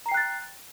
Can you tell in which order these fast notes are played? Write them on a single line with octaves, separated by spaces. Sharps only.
A#5 C7 G5 F#6 A6